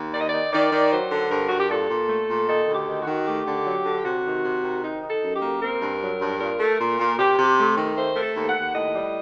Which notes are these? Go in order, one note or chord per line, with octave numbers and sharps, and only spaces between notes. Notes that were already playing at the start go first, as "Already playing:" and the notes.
Already playing: D#2
D#3 D5
D#5
D#3 D5
D#3 D5
D#3
F#3 C5
D3
G2 A#4
G2 F#4
G4
A#2 A4
A#2
A3
A#2
D#3 A4
D2
G4
D#3
F#4
D#3
A3 G4
D3
F#3
D3
C3 F#4
D#3
C3
D#3
D#4
D#4
A4
F#2
G4
A#3
C4 A#4
G2
F#3
G2
A#2 A#4
A3
A#2
A#2
C3 G4
C3
G4
A3
D#3
A3 C5
A3 A#4
A4
D#2
F#5
D#2
A2 D#5
G3